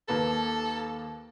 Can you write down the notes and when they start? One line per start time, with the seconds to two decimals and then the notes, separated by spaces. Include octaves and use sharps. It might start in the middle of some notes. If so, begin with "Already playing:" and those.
0.08 D#2 A#3 A4 B4